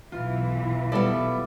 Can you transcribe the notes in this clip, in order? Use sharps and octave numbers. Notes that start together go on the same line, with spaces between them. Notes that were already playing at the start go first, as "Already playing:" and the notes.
B1 E3 F4
G3 B3 E4 A4 D5